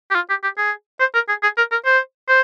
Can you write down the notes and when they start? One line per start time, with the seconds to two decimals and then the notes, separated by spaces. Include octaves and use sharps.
0.11 G4
0.15 F4
0.30 G4
0.43 G4
0.58 G#4
1.00 C5
1.14 A#4
1.29 G#4
1.43 G#4
1.58 A#4
1.72 A#4
1.86 C5
2.28 C5